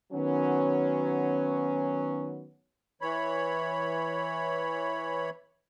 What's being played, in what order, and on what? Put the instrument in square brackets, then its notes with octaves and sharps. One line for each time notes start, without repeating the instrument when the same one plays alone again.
[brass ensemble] D#3 F#3 B3 C#4
[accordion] E3 C#5 B5